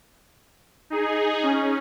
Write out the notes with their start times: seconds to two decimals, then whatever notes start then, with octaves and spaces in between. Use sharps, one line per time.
0.90 D#4 G#4
1.43 C#4